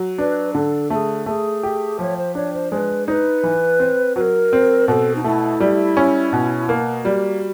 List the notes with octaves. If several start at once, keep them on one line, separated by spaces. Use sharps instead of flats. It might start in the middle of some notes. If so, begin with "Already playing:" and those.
Already playing: F#3
D4 B4
D3 A4
A3 A4
G#4
A3 G#4
G4
F3 C#5
C5
D4 C#5
C5
G#3 B4 C5
D#4 B4 C5
E3
C4
F#3 A#4 B4
C4
B2 A4 A#4
D#4
A3 E4
G3
C#4
B2
A#3
G3 F#4 G4